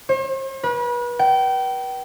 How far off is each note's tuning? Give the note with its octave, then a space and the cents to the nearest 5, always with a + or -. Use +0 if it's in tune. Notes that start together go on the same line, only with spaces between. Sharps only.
C5 +45
B4 -35
G5 -30